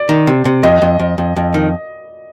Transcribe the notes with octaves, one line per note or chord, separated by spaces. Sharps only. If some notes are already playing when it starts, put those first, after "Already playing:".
Already playing: D5
D#3
C3
C3
F2 D#5
F2
F2
F2
F2
D#3